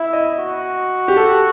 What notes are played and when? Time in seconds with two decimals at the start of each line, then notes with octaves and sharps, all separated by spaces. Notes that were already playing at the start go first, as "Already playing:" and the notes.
Already playing: E4 E5
0.13 D#5
0.39 F#4
1.08 G4
1.16 A4